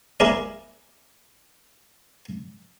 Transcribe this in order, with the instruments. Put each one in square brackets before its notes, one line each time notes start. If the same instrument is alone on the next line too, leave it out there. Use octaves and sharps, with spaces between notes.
[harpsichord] E4 G#4 A#4 D5